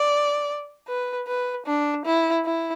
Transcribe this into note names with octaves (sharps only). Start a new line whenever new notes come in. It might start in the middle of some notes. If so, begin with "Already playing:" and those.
Already playing: D5
B4
B4
D4
E4
E4